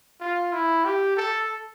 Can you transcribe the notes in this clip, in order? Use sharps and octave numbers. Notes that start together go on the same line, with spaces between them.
F4
E4
G4
A4